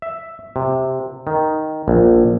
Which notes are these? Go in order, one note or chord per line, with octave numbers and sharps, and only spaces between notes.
E5
C3
D#3
A#1